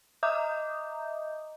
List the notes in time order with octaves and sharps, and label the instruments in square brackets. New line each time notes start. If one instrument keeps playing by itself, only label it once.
[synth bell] D#5 E5 A#5 D6 D#6 G6